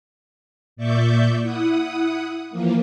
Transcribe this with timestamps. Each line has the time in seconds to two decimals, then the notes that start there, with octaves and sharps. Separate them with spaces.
0.76 A#2 D5 E5 C#6 D6 G6
1.42 E4 F#5 D#6
2.51 E3 F3 A#3